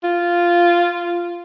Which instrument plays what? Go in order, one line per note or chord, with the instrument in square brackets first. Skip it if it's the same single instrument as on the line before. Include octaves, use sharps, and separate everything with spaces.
[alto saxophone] F4